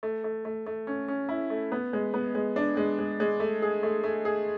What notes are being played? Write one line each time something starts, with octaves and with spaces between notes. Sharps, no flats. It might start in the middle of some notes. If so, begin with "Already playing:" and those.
A3
A3
A3
A3
C#4
C#4
E4
A3
B3
G#3
B3
G#3
D4
G#3
G#3
G#3
A3
G#4
A3
A3
G#4